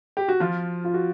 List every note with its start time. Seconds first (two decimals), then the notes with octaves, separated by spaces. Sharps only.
0.17 G4
0.28 F#4
0.40 F3 F4
0.85 F4
0.94 F#4